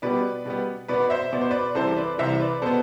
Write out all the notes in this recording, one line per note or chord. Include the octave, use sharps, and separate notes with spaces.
B2 G3 B3 B4 D5
B2 G3 B3
B2 B3 B4 D5
C5 E5
B2 B3 D5
C5
B4 D5
C2 C3 E3 A4 C5
B4 D5
C2 C3 E3 C5 E5
B4 D5
B2 B3 A4 C5